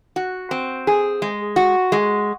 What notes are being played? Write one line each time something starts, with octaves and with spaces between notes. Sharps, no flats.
F#4
C4
G#4
G#3
F#4
G#3